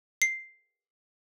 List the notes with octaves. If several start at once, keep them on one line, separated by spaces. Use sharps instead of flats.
C7